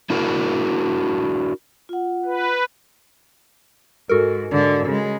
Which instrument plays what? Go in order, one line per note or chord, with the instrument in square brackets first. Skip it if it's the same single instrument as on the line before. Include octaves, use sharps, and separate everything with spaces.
[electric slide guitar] D4 E4 F#4 A#4
[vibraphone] F4 F#5
[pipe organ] B4
[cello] G#2 [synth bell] F#4 A4 A#4
[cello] G#2 D3
C#3 G#3